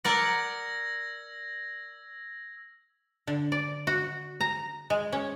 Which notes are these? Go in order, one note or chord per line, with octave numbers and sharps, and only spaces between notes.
A#4 D5 F#5 E6 G#6 A#6
D3
D5
F#4
A#5
G#3
C#4